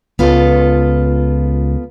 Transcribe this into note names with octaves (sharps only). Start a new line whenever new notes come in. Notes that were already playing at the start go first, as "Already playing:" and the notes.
C#2 B3 F4 A4